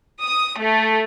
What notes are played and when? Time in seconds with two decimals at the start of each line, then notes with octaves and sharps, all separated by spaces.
0.21 D#6
0.59 A3